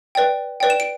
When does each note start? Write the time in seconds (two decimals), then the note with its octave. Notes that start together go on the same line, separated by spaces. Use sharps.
0.15 B4 D5 G5
0.60 B4 D5 G5
0.70 E7
0.80 D7